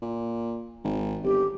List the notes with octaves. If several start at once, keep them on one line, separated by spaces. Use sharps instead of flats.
A#2
G#1
G1 G4